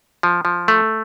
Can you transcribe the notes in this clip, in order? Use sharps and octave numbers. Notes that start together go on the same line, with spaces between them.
F3
F3
A3